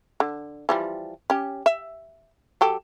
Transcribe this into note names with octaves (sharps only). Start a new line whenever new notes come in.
D3
E3 F3 G3
C#4 G4
E5
F#3 G4 A4